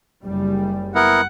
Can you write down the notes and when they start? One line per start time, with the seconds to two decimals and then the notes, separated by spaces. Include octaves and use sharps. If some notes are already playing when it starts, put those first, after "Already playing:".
0.23 F#1 G3
0.95 B3 E4 A#4 F#5